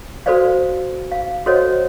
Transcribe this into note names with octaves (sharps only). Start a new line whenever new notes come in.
F#4 A4 B4 C5 D5 F5
F5
F#4 A4 C5 C#5 D#5 F#5